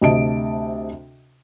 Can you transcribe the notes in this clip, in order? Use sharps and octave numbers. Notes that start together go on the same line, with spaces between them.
D2 C3 D#5 A5 D7